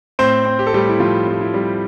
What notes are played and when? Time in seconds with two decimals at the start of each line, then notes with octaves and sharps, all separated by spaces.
0.19 A2 C4 C5
0.45 C4
0.59 G4
0.67 A4
0.73 A2 G3 G4
0.89 E4
1.00 A2 F3 F4
1.28 G3 F4
1.41 E4
1.54 G3